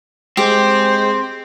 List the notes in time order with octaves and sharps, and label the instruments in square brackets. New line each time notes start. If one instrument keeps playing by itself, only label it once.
[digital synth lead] G#3 [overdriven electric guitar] C4 [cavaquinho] G4 [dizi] C5